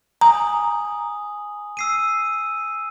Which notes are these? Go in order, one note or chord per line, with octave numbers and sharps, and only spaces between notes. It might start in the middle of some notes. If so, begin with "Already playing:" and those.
G#5 A#5 D#6 F#7
E6 C7 D#7